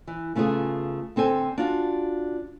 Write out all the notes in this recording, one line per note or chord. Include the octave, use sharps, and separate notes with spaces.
E3
C#3 A3 B3 F4 G#4
D3 C4 A4 G#5
D4 F4 F#4